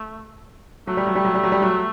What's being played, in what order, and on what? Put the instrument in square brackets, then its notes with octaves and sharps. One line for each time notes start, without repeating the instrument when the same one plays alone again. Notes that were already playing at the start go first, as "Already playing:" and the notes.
Already playing: [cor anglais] A3
[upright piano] F#3 [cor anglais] A3
[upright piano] G3
F#3
G3
F#3
G3
F#3
G3
F#3